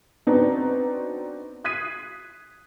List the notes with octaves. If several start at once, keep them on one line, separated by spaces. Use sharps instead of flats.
B3 C4 D4 D#4 F#4 B4
D#6 F#6 G#6 B6 C7 D#7